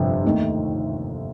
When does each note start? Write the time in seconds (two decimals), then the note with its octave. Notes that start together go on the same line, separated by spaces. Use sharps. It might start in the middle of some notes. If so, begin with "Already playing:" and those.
Already playing: G1 F2 C3
0.24 D#2 D#3 A3